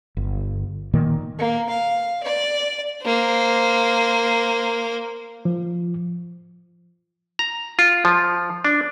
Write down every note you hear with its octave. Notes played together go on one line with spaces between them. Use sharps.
G1
A#2 D#3 A#3
A#3
F5
D5
A#3 C5
F3
A#5
F4
F3
D4